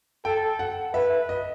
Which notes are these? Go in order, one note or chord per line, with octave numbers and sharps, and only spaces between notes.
A4 G5
F#5
B4 E5
D#5